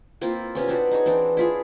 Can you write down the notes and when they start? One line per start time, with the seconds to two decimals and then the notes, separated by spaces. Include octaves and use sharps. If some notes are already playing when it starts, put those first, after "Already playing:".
0.21 A#3 C4 E4 F4
0.55 C3 B3 C#4
0.68 B3 C4 D4 F#4
0.91 D#4 G#4 C#5
1.06 E3 C4 D4
1.37 E4 F4 G#4